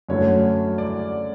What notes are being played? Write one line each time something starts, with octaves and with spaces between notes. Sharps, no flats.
F#2 D3 F#3 A3 C#5
D5